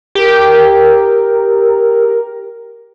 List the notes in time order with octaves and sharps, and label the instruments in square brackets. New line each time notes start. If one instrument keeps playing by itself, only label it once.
[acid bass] G4 [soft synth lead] A#4